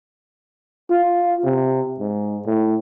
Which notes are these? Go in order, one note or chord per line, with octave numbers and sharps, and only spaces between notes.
F4
C3
G#2
A2